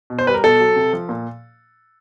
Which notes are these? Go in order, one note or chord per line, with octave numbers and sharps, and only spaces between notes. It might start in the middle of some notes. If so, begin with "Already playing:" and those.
B2
C5
G3 B4
A#4
B2 A4
F#3
C3
F3
A#2